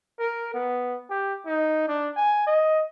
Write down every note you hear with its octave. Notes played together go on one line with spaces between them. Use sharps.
A#4
B3
G4
D#4
D4
G#5
D#5